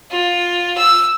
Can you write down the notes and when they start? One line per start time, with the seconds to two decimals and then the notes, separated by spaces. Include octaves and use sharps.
0.11 F4
0.77 E6